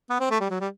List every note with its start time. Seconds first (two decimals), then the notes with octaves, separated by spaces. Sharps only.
0.10 B3
0.20 C4
0.30 A3
0.40 G3
0.50 F#3
0.60 G3